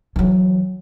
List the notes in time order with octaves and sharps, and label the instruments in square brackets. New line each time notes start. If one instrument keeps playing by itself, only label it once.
[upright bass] E3 F#3